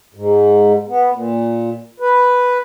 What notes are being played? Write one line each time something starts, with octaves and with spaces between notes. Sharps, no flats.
G#2
B3
A#2
B4